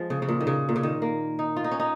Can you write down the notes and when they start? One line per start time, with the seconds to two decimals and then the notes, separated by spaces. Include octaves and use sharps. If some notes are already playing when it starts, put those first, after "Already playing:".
Already playing: F3 G#3
0.10 C#3
0.22 C#3
0.29 A#2
0.40 D#3
0.47 C#3
0.69 A#2
0.76 C#3
0.83 D#3
1.02 A#3
1.39 D#4
1.57 F4
1.64 D#4
1.71 C#4
1.80 D#4